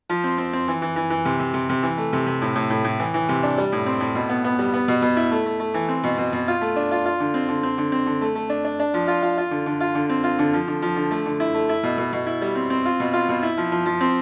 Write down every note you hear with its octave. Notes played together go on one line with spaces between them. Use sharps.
F3
C4
C4
C4
E3
E3
E3
E3
C3
C3
C3
C3
E3
A3
C3
C3
A2
A2
A2
A2
E3
E3
C3
D4
G3
A2
C4
A2
B2
B3
B3
G3
B3
B2
B2
E4
A3
A3
A3
E3
C4
B2
B2
B2
F4
A3
D4
F4
F4
D3
C4
D3
C4
D3
C4
D3
A3
A3
D4
D4
D4
F3
F4
F4
F4
D3
D3
F4
D3
C4
F4
D3
F3
D3
F3
D3
A3
D3
E4
A3
E4
B2
B2
B2
E4
G3
C4
C4
F4
B2
F4
B2
E4
F3
F3
F3
C4